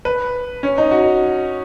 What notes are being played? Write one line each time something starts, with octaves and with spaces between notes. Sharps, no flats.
B4
C#4
D#4
F#4